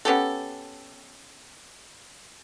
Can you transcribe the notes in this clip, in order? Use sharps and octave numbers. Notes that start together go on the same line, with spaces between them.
B3 C#4 G4 A4